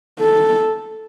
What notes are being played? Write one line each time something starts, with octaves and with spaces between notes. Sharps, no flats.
A4